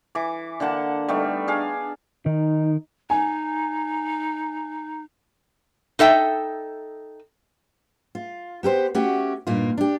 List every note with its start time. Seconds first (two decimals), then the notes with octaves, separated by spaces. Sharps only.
0.15 E3 D6
0.60 D3 A#3 F#5 A5
1.08 G3 A3 B3 D#4
1.48 D4 G#4 F5 G#5
2.26 D#3 D#4
3.10 D#4 G#5
5.99 D#4 A4 E5 G5
8.15 F4
8.63 B3 G4 A4 C5
8.94 A3 C#4 F#4 G4
9.47 G2 A#2 A#3 D#4 F4
9.78 D4 G4